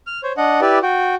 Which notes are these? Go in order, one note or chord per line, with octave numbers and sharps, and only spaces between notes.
F6
C5 C#5
D4 D#5 F#5
E4 G4 B4 D5
F#4 G5